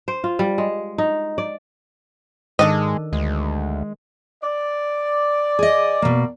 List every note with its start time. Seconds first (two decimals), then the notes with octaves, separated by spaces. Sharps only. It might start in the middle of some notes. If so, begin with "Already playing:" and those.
0.08 C5
0.24 F4
0.39 G3
0.58 G#3
0.98 D#4
1.38 D5
2.59 G#2 D#3 G#3 D4 A4 D#5
3.13 D2 G#3
4.42 D5
5.59 G#4 D#5
6.02 B2 A#3